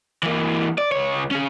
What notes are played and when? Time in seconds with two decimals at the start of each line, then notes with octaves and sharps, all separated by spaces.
0.23 E3 A#3
0.78 D5
0.92 C#2 C#5
1.31 C#4 G#4